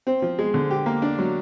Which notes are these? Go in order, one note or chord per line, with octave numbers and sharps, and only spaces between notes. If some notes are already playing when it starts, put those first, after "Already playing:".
C4
F3
G#3
D3
G4
A#3
D4
F#3